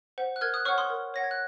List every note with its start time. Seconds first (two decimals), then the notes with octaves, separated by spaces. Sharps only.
0.18 C5 F#5
0.36 F#6
0.41 A#4 F6 G#6
0.54 D#6 F#6
0.65 C#5 F#5 C#6 F6
0.78 C6 D#6
0.90 A#4
1.14 C#5 F#5 A#6
1.23 G#6
1.31 F#6